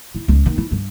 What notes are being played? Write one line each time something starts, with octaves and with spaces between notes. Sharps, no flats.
E4
C#2
D#3 A#3
E4
G2